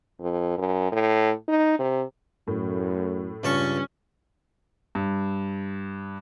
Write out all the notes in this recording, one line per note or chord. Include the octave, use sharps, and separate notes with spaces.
F2
F#2
A2
D#4
C3
F#2 A2
C#2 G2 C#4 A5 C#6
G2